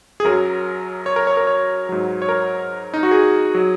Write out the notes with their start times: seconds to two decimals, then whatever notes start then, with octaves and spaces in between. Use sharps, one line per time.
0.20 G#4
0.24 F#2 F#3 A#4
1.06 C#5
1.16 A#4
1.27 C#5
1.37 A#4
1.47 C#5
1.89 G#2 F#3
2.22 C#5
2.29 A#4
2.94 D#4
3.03 F#4
3.11 G#4
3.55 F#3